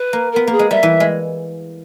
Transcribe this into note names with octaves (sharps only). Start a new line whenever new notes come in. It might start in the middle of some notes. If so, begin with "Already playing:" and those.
Already playing: B4
A#3
B3 A#4
A#3 G#4
G#3
G3 E5
E3
G#3